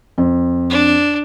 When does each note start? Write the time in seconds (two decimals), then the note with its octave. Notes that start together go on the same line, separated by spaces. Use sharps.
0.18 F2
0.70 D4